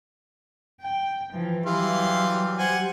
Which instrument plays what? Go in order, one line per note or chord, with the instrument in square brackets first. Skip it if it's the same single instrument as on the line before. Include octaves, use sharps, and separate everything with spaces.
[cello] G5
E3 F3
[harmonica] E3 F5 C6 [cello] F#3 G3 [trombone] G4
[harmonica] C5 F#5 G#5